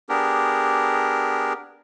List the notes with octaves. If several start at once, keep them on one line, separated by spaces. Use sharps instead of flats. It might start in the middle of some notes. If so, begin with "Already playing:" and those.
B3 D4 G4 G#4 A#4